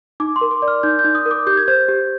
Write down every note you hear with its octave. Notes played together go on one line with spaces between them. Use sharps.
D#4 D6
C6
A#4
D6
D5
F6
D#4 G6
G6
D#4
D#6
A#4
D6
G4 G6
G#6
C5 G6
G4